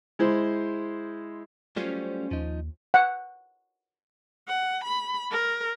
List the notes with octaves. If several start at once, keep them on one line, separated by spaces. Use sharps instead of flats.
G#3 E4 C5
F#3 G3 A3 C#4 F4 C5
D#2 F3 D#4
F#5
F#5
B5
A#4